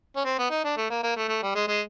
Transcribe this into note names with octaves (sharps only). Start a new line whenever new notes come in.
C#4
C4
B3
D#4
D4
A3
A#3
A#3
A3
A3
G3
G#3
G#3